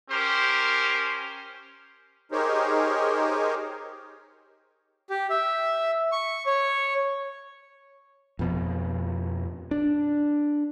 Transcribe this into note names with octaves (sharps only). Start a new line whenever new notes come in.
C#4 G4 A#4 C5
D#4 G4 G#4 A#4 C5 C#5
G4
E5
C#6
C#5
F2 B2 F3
D4